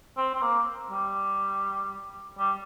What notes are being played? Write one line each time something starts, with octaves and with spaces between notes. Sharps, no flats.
C4
C4
A#3
G3
G3